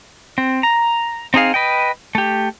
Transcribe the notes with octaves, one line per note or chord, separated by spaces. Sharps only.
C4
A#5
C4 D#4 G#4 F5
B4 D#5 G5
A3 G4